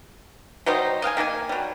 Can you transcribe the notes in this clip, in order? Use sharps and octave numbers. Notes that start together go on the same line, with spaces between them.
F#3 G3 D#4 C5
D#5 F5 G5 G#5
D#3 A#3 G4 G#5
F#3 G3